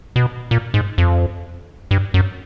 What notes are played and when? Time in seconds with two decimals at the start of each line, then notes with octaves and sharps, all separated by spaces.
0.16 B2
0.51 A#2
0.74 G#2
0.98 F2
1.91 G2
2.14 F#2